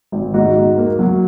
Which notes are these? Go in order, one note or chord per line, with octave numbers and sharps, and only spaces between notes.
G#1
G#2 D#4 F#4
G#2
A#3
F#3